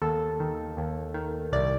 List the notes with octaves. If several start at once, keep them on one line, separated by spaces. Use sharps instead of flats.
D#2 A4
D#3
D#2
D#3
C2 D5